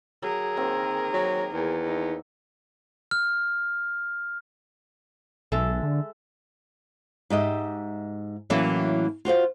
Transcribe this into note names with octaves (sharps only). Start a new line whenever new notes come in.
F#3 G#4 A#4
D#3 A#3 C4
F#3
E2
D#4
F6
B1 G#3 A4 E5
D3
G#2 G4 D#5 E5
A2 E3 F#3 A#3 C#4 E4
F4 F#4 C5 F5